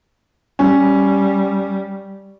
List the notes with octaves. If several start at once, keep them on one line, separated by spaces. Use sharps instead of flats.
G3 C#4